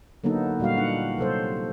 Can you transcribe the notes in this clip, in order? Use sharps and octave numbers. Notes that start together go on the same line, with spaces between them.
D3 F#3 A#3 B3 D#4 A4
A#2 G3 F#4 F5
D4 D#4 F#5
C3 F#3 A4 C5